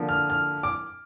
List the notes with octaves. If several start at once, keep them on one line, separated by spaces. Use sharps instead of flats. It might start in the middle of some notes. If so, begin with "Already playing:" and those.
Already playing: D3 F3 A#3
F6
F6
D6